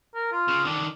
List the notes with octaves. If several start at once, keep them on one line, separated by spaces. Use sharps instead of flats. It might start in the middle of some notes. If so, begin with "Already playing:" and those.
A#4
F4
C#3
D3 D#3 D4